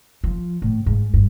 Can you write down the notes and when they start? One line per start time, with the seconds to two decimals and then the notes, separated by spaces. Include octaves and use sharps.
0.24 F3
0.62 A2
0.86 G#2
1.14 G2